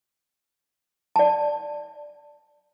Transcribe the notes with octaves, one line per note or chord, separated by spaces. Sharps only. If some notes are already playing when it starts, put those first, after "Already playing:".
D5 A5